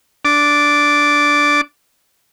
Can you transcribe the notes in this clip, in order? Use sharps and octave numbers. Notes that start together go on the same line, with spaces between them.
D4 D6